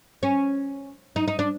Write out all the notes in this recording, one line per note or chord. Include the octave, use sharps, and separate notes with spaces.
C#4
D#4
D#4
D4